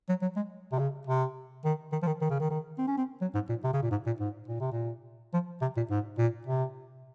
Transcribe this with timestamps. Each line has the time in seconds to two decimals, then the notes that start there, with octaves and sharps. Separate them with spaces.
0.09 F#3
0.22 F#3
0.36 G#3
0.72 C3
0.79 C#3
1.07 C3
1.65 D#3
1.92 D#3
2.02 F3
2.07 D#3
2.21 D#3
2.30 C#3
2.40 D#3
2.50 D#3
2.78 C4
2.88 C#4
2.98 C4
3.21 F#3
3.35 G#2
3.49 A#2
3.64 C3
3.73 C#3
3.82 A#2
3.91 G#2
4.06 A#2
4.20 G#2
4.48 A#2
4.60 C3
4.72 A#2
5.34 F3
5.62 C3
5.77 A#2
5.91 G#2
6.18 A#2
6.47 C3